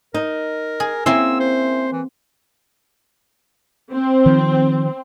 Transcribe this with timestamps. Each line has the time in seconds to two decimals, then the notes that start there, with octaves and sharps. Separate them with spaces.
0.14 D#4 A#4
0.80 G#4
1.06 A#3 C4 C#4 E4 C6 E6
1.40 C5
1.93 E3
3.93 C4
4.26 D#3 F3